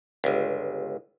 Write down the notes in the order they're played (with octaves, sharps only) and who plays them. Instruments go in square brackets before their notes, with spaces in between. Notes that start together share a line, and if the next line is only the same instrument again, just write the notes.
[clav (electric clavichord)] G1 C#2